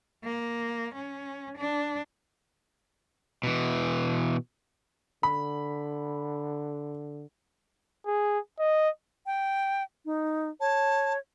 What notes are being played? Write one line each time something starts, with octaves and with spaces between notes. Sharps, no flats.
A#3
C#4
D4
B2 E3
D3 B5
G#4
D#5
G5
D#4
C#5 A5